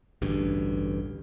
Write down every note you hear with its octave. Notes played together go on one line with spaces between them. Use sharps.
A1 D2 G2